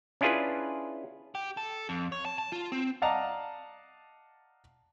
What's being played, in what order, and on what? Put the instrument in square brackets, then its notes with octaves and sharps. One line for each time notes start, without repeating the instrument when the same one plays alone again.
[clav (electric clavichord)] C#4 D4 E4 F4 G#4 B4
[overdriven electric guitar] G4
A4
F2
C#5
A5
A5
F4
C4
[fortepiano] D5 D#5 F5 F#5 A5 A#5